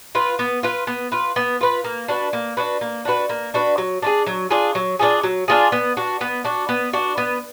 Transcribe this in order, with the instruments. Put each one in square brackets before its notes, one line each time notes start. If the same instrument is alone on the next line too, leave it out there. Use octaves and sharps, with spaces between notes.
[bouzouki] F4 B4
B3
F4 B4
B3
F4 B4
B3
F4 B4
A#3
D4 F#4 B4
A#3
D4 F#4 B4
A#3
D4 F#4 B4
A#3
D4 F#4 B4
F#3
D4 F4 G#4
F#3
D4 F4 G#4
F#3
D4 F4 G#4
F#3
D4 F4 G#4
B3
D4 F#4
B3
D4 F#4
B3
D4 F#4
B3